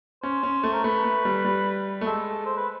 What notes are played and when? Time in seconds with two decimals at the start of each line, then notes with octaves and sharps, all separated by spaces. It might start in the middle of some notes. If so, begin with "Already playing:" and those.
0.23 C#4 C5
0.43 C#4
0.64 A3
0.73 A#4
0.84 A3 B4
1.04 A3
1.25 G3
1.45 G3
2.01 A3
2.06 G#3 A4
2.46 C5
2.57 B4